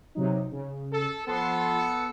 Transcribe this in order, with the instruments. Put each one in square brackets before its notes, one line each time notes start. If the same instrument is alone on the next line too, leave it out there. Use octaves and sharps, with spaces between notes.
[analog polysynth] C3 F#3 D#4
C#3
[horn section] A4
[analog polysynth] F3 C6 C#7 [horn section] B3 A4
[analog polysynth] C#7